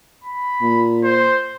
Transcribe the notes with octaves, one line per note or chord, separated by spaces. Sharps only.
B5
A#2
C5